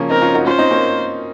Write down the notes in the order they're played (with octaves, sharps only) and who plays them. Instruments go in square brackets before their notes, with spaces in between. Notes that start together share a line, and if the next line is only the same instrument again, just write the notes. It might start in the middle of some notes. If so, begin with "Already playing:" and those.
Already playing: [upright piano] C#3 F3 A#3 C#4
[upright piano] C4 D#4 [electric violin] A#4
[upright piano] C#4 F4
D#4 F#4
[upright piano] C#4 F4 [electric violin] C5
[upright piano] C4 D#4
A#3 C#4